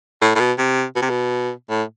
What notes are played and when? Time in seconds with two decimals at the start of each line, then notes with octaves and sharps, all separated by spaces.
0.21 A2
0.35 A2
0.39 B2
0.58 C3
0.95 B2
1.02 C3
1.10 B2
1.70 A2